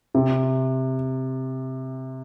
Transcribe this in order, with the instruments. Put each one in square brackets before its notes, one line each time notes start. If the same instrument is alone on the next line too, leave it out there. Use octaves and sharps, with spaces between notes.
[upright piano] C3